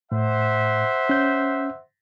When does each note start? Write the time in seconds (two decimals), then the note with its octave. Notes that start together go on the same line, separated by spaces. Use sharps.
0.12 A2 C5 E5 F#5
1.09 C#4 G6